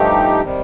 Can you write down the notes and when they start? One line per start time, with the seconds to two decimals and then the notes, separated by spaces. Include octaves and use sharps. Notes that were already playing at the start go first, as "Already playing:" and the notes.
Already playing: G2 F3 A3 D#4 G4
0.42 C3 D#3 G3